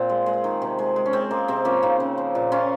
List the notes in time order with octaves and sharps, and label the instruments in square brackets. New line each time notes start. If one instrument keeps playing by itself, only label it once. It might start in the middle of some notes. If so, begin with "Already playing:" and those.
Already playing: [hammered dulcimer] A#2 A#3 C4
G#3
G#3
D#3
C3
G#3
G#3
C#4
G#3 C4
G#3 A#3
C3 C4
F3 A#3 C#4
C#3 C4 D#4
C#3
F3
A#2
C#3 C#4 F4